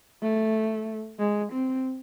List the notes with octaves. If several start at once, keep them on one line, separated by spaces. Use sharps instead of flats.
A3
G#3
C4